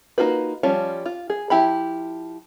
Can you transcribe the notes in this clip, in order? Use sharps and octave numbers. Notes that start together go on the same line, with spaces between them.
A#3 D#4 F4 F#4 B4
F3 G3 C#4 F4
F4
G#4
F3 E4 G4 B5